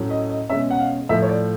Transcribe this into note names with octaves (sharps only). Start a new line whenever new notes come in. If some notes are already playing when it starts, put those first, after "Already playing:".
Already playing: A2 F#3 A3 C#4
D#5
D#5
B2 G#3 C#4 E5
F#5
F5
A2 F3 A3 E5
C#5
D5